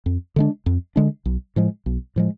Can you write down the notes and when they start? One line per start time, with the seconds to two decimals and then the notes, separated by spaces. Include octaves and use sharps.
0.06 F2
0.36 D3 G#3 D4
0.66 F2
0.96 D3 G#3 D4
1.25 B1
1.56 A2 F3 G#3
1.86 B1
2.16 A2 F3 G#3